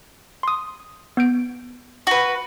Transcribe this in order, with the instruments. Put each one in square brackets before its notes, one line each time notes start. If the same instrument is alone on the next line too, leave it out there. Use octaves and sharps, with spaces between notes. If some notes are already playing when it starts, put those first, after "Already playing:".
[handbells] C6 D#6
B3 G6 D7
[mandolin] F#4 B4